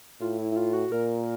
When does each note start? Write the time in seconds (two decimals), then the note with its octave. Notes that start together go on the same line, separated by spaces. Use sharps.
0.21 A2 F4
0.38 E4
0.52 E4
0.57 F4
0.73 F#4
0.91 A#2 A#4